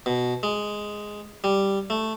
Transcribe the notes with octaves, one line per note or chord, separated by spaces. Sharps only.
B2
G#3
G3
A3